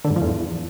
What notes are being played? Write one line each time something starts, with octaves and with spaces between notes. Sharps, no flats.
D3
G#2
F3
E2